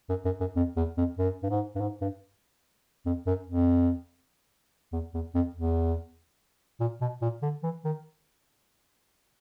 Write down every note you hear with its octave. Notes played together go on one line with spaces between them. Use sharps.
F#2
F#2
F#2
F2
E2
F2
F#2
G2
G#2
G2
G#2
G2
F2
F#2
F2
E2
E2
F2
E2
A#2
B2
A#2
D3
E3
D#3